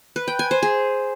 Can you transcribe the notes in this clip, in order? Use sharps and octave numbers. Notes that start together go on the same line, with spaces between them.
B4
G5
G#5
C5
G#4